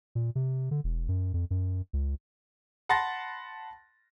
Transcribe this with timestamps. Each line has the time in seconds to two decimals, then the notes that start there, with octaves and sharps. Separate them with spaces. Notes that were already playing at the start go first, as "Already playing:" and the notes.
0.15 A#2
0.35 C3
0.71 D3
0.84 E1
1.08 F#2
1.34 F2
1.51 F#2
1.93 C#2
2.89 F#5 A5 B5 C6 A6 A#6